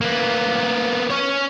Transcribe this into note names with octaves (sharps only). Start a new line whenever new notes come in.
A#3 B3
C#4 C#5